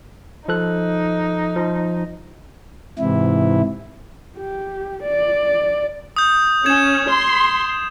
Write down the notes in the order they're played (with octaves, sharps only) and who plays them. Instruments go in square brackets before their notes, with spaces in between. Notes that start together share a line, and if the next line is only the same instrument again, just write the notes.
[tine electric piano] F3 A4 F#6 [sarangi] D#4
[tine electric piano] F3
[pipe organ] G#2 C3 E3 E4
[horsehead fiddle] G4
D5
[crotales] D#6 G6
[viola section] C#4 [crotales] G#6 E7
[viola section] C6